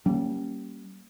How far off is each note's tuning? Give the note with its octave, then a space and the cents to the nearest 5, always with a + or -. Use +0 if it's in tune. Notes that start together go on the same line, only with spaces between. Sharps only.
G3 -30 A#3 +0 C#4 +0